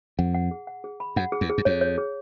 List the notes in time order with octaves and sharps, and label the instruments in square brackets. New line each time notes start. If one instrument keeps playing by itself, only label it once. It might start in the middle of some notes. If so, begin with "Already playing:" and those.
[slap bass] F2 [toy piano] F#5
[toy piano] F#5
G#4
F#5
G#4
B5
[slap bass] F#2 [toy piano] F#5
[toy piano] G#4
[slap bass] E2
[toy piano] G#4
[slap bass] F#2
[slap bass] F2 [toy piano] C#5
[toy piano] C#5
G#4